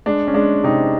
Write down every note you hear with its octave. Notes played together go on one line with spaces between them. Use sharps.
G#3 D4
C#4
G#3 D4
C3 D#4